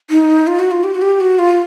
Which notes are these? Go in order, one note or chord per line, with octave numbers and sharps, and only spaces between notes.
D#4
F4
F#4
F4
G4
F#4
G4
F#4
F4